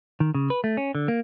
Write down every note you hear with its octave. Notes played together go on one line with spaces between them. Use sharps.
D#3
C#3
B4
A3
C#4
D3
A#3